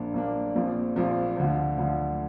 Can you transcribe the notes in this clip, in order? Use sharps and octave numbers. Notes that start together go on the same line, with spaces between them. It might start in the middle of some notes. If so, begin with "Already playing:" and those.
Already playing: A#1 A#2 A#3 D4
A#1 A#2 A#3 D4
A#1 A#2 F3 C4
A#1 A#2 F3 C4
D2 D3 F3
D2 D3 F3